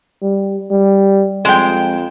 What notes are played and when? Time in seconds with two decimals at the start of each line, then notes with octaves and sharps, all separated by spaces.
0.22 G3
0.71 G3
1.45 F2 G#3 G5